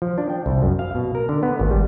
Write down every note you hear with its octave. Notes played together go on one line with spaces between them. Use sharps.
F3
D4
G5
C2
F#2
F5
B2
A#4
D3
B3
G#1
G3